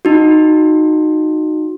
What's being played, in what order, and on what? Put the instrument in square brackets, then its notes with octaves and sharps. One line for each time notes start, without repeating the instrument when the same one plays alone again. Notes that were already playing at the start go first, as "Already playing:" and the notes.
[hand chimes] D#4 F#4